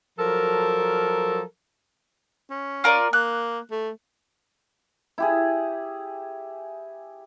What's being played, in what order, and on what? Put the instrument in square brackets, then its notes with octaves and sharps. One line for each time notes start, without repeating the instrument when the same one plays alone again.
[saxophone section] F3 F#3 A4 A#4
[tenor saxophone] C#4
[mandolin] F4 A#4 D5
[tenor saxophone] A#3 [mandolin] F#6
[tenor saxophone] A3
[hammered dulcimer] E4 G4 G#4